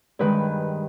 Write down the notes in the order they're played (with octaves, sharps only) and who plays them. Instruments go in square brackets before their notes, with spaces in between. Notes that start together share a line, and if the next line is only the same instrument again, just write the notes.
[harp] G2 D#3 G#3 B4